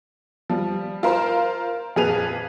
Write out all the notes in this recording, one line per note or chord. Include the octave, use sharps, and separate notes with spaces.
F3 G3
F4 A#4 C5
F2 A#2 G#4 B4 D#7 F7